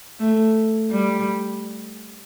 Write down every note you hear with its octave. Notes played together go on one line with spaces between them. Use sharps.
A3
G3